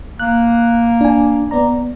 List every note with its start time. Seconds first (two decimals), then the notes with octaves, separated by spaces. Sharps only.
0.19 A#3 F#6
1.01 D4 G#5
1.51 B3 D5 A#5